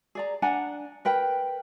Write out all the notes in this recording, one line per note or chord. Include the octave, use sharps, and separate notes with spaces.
G#4 D5 A#5
D4 F#5 G#5 A#5
A#4 B4 G5